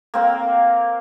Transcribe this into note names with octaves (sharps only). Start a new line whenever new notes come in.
A#3 C4 A#4